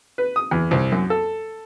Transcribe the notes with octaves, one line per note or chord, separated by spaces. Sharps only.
B4
D#6
E2
C2
F#2
A4